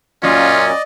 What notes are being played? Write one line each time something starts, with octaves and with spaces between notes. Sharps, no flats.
F#2 A#2 C#4 F4 D5 D#5